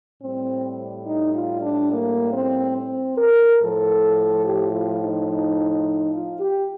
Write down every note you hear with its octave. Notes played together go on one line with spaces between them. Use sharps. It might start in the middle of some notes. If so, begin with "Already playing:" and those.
A2 G3 C4
D#4
F4
D4
A#3
C4
C4
A#4
A2 F3 A4
G4
F4
D#4
D#4
D#4
F4
G4